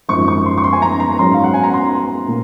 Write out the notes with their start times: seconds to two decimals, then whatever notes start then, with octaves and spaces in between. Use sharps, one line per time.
0.09 G#1 F#2 F3 C#6
0.28 C#6
0.46 C6
0.58 C#6
0.64 C6
0.73 G#5
0.82 A#5
1.00 A#5
1.11 A#5
1.18 G#2 F#3 C#4 C6
1.34 F5
1.44 F#5
1.54 G#5
1.63 A#5
1.74 C6
2.28 A#2